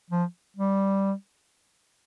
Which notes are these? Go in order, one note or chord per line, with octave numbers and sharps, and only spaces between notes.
F3
G3